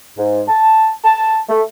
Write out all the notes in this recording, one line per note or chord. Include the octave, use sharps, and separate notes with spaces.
G#2
A5
A5
A3